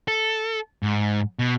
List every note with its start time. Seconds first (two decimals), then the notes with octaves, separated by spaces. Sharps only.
0.08 A4
0.83 G#2
1.39 B2